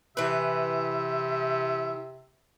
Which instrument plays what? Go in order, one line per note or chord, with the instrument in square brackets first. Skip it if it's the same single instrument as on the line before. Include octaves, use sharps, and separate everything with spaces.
[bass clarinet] C3 [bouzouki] E3 B4 [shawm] E5